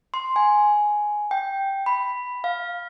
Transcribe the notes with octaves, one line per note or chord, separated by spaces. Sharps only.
C6
G#5
G5
B5
F5